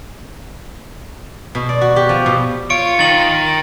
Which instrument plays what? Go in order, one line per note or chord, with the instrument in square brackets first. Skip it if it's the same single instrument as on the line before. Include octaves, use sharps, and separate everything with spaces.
[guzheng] B2
D5
F#4
G4
F3
B2
[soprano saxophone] F4 [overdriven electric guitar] C#5 [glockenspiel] D7
[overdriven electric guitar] D#3 D#4 [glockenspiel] A6 F#7